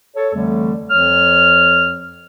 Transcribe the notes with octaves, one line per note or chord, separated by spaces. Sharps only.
A4 C#5
F2 D3 E3 G3 A3
F2 F3 C#5 F6